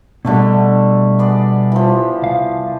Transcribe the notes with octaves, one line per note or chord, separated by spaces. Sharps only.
B2 D3 G3 A3 D5
B3 G#4 D5
E3 F3
C2 F5